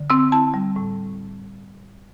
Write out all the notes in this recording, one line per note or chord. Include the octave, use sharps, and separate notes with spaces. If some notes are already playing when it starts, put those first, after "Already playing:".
Already playing: D3
C4 E6
E4 A5
G3
A2